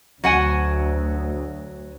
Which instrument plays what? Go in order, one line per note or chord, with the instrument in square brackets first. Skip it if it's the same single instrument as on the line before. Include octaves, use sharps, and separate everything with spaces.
[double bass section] D2 [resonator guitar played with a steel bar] F#3 F#5 G#5